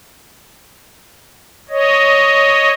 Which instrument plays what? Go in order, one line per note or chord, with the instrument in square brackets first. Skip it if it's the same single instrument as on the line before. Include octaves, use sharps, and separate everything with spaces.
[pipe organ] C#5 D#5